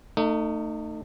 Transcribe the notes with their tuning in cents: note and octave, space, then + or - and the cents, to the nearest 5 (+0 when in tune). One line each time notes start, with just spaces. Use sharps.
A3 +30 D#4 -20